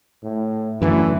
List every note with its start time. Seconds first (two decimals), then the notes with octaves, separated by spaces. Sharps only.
0.23 A2
0.82 F#2 D3 E3 A3